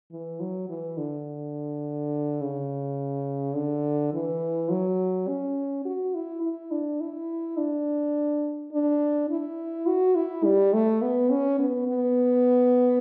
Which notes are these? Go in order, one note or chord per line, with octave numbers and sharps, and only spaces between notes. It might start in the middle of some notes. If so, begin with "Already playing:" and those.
E3
F#3
E3
D3
C#3
D3
E3
F#3
C#4
F#4
E4
E4
D4
E4
D4
D4
E4
F#4
E4
G3
A3
B3
C#4
B3
B3